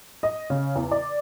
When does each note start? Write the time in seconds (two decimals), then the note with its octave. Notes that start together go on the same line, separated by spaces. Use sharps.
0.23 D#5
0.50 C#3
0.76 E2
0.91 D5